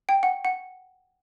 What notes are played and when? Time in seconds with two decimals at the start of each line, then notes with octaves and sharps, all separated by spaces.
0.09 G5
0.23 F#5
0.45 F#5